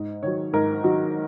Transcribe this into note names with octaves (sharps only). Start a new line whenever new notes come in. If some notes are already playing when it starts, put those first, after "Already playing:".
Already playing: G#2 D#5
D#3 F#3 C#5
G#2 A#4
D#3 F#3 F#4